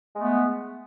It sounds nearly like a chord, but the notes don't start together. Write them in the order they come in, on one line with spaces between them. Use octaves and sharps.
G#3 A3 B3